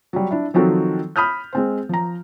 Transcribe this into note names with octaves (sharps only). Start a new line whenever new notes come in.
F#3 G3
D4 E4
D#3 F3 F#3 C4 F#4 A4
B5 D#6 F6 G6
G#3 C4 C5
F3 A#5